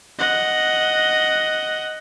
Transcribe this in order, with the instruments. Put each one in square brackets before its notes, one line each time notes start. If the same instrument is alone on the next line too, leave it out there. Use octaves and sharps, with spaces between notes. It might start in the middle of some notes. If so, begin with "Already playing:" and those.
[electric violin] D#5 F#5